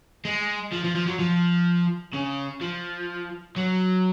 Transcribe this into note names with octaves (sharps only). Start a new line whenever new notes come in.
G#3
F3
F3
F3
F#3
F3
C#3
F3
F#3